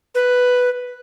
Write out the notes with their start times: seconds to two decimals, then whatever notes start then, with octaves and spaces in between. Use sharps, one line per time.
0.15 B4